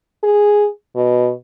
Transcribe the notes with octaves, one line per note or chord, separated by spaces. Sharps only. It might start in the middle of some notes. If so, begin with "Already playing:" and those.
G#4
B2